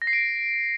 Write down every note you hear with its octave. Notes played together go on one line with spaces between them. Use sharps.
A#6
C7
D7